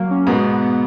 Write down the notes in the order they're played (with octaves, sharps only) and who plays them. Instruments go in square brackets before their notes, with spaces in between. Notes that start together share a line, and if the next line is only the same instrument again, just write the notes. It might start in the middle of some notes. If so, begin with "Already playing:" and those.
Already playing: [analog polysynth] F#3 A#3
C#4
[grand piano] G#2 B2 [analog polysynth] B3
[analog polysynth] B3
B3